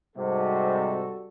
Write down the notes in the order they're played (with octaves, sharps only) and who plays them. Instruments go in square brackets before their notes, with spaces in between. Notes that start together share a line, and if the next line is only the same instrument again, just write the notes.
[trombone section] G#2 C3 [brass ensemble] G3 F#4 A4